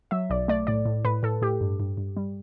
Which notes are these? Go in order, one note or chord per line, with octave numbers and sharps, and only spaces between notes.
F#3 E5
B1 D5
A3 D5
A2 D5
A2
A2 B4
A2 A4
A2 G4
G2
G2
G2
G3